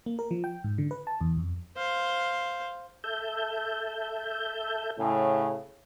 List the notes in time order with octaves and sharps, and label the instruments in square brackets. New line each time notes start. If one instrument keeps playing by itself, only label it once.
[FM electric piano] A#3
A#4
F3
G5
G#2
D3
B4
A5
E2
F2
[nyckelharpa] C5 F5
[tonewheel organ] A4 E5 G6
[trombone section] A2 C#3